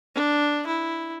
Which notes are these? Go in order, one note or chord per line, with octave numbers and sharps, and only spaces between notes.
D4
E4